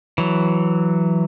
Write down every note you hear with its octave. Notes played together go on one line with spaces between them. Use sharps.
E3 F#3